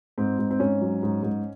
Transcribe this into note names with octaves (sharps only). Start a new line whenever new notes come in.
G#2 C4
G#2
C4
G#2 C#4
F#3
G#2
G#2